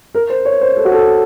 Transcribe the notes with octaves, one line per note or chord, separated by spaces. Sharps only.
A#4
C5
C#5
C5
A4
F#4
A4